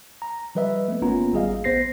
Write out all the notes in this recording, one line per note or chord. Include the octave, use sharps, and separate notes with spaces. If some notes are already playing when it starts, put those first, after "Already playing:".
A#5
F3 G3 B4 D#5 E5
A3 B3
G1 A#3 B3 C#4 F4 A#5
G#1 G3 G#4 D#5 F5
A#1 B3 C5 A#6 C7